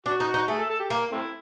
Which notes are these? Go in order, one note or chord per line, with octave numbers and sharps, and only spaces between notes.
D4 F#4
D#4
F#4
D#4
A3 G#4
A4
A4
G4
A#3
A3 C4 E4